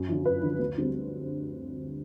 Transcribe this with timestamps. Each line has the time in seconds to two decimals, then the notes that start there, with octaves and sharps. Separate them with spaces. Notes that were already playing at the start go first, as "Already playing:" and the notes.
Already playing: F#2
0.09 D3 F3
0.25 F#2 B4
0.43 D3 F3
0.59 D2
0.78 D3 G3 C4